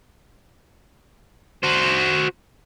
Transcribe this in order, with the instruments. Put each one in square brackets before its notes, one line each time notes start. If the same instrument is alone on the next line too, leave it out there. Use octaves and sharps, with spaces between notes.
[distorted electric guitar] F#4 C5